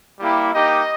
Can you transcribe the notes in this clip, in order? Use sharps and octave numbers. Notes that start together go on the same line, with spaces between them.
G3 A#3 E4 G4
A#3 D#4 G4 D#5